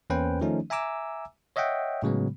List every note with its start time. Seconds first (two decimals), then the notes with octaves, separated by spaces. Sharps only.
0.10 E2 A#3 C#4 B4 C5 G5
0.41 D#3 F3 A3 C#4 D#4
0.70 E5 G#5 A#5 D6 E6
1.56 C#5 D#5 E5 F#5 G5
2.02 A2 C#3 F#3 G#3 B3